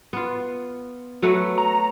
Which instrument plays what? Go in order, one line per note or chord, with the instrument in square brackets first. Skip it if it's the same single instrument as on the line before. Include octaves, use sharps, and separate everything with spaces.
[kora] B3 F4
F#3 A3 B4
[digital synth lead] A#5